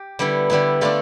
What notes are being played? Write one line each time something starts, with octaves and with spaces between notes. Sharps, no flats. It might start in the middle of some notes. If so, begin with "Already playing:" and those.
Already playing: G4
D3 G3 B3 E4
D3 G3 B3 E4
D3 A3 D4 F4 A4